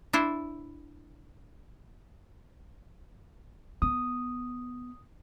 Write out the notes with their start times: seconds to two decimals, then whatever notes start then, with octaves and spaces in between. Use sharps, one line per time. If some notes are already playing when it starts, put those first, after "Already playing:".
0.13 D4 E4 C5
3.82 B3 D#6